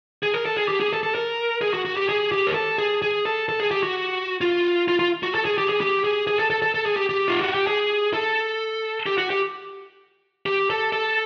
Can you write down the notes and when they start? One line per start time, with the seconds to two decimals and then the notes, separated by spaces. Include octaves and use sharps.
0.23 G#4
0.34 A#4
0.45 A4
0.57 G#4
0.68 G4
0.80 G#4
0.93 A4
1.03 A4
1.15 A#4
1.61 G#4
1.74 F#4
1.85 F#4
1.97 G4
2.09 G#4
2.32 G4
2.47 A#4
2.54 A4
2.78 G#4
3.02 G#4
3.25 A4
3.49 A4
3.60 G#4
3.71 G4
3.83 F#4
4.41 F4
4.88 F4
4.99 F4
5.23 F#4
5.35 A4
5.45 G#4
5.58 G4
5.69 G#4
5.81 G4
6.04 G#4
6.27 G#4
6.39 A4
6.50 A4
6.62 A4
6.74 A4
6.86 G#4
6.97 G4
7.09 G4
7.28 F4
7.41 F#4
7.54 G4
7.67 G#4
8.14 A4
9.06 G4
9.18 F#4
9.30 G4
10.46 G4
10.70 A4
10.92 A4